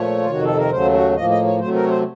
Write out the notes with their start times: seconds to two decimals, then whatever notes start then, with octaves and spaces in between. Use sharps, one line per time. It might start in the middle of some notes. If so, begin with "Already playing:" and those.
Already playing: A#2 F3 A3 C#5
0.18 F4
0.26 F2 C3 D#3 F#4
0.44 A4
0.57 A#4
0.71 D#2 C#3 F#3 A3 C5
0.93 F#4
1.15 A2 F3 A#3 D#5
1.30 D#5
1.45 C#5
1.59 C3 F#3 A3 C5
1.75 A#4
1.83 C#5
1.89 C5